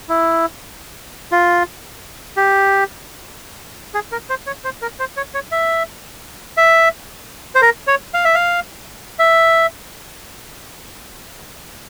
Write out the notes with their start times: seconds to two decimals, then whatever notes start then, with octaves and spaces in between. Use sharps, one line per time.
0.09 E4
1.32 F4
2.37 G4
3.94 G#4
4.12 A#4
4.29 C5
4.47 C#5
4.64 C5
4.82 A#4
5.00 C5
5.17 C#5
5.34 C#5
5.52 E5
6.57 E5
7.55 C5
7.62 A#4
7.87 C#5
8.14 F5
8.25 E5
8.35 F5
9.19 E5